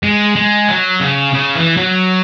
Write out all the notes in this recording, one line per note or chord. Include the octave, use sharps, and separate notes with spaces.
G#3
G#3
F#3
C#3
C#3
E3
F#3